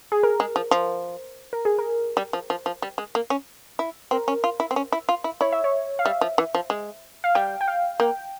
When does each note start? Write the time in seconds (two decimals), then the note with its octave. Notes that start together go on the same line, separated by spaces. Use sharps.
0.12 G#4
0.23 A#4
0.40 G#3
0.56 F3
0.71 F3
1.53 A#4
1.65 G#4
1.79 A#4
2.17 G3
2.33 F3
2.50 F3
2.66 F3
2.82 G3
2.98 G#3
3.15 A#3
3.30 C#4
3.79 E4
4.11 C4 A#4
4.28 C#4
4.44 F4
4.60 E4
4.71 C4
4.76 C#4
4.92 E4
5.09 F4
5.24 E4
5.41 E4 C#5
5.52 E5
5.64 C#5
5.99 F5
6.05 G3 E5
6.21 F3
6.38 E3
6.55 F3
6.70 G#3
7.24 F5
7.35 G3 G5
7.61 G5
7.68 F5
8.00 A#3 G5